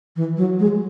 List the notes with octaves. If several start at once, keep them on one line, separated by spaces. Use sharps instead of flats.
E3
F#3
G#3